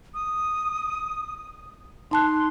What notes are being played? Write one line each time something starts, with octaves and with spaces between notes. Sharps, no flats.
D#6
D#4 A5 C6 F#6